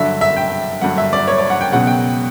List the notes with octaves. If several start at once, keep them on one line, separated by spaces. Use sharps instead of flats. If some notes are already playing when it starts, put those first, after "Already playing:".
Already playing: G2 D3 F#3 E5
E5
G5
G2 D3 F#3 F#5
E5
D5
C#5
D5
F#5
G5
C#2 B2 F#3 F#5
G5